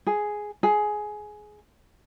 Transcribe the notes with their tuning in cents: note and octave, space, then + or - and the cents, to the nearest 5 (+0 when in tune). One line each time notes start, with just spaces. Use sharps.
G#4 +5
G#4 +15